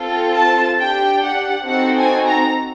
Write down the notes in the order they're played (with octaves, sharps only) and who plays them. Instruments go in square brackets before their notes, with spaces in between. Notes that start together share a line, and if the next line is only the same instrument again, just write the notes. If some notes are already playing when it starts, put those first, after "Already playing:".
Already playing: [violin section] C4 F4 A4
A5
D4 G4 G5
F#5
C4 D#4 F#4 A4 F#5
G#5
A#5